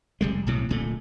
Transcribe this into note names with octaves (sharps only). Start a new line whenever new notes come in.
F1 G3 G#3
B1 A2 C3
D1 A#2 A3